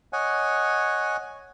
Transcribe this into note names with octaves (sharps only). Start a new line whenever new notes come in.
C#5 D#5 F#5 G#5